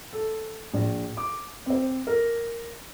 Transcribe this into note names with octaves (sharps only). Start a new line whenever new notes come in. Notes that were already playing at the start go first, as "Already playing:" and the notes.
A4
A#1
D6
C4 C5
A#4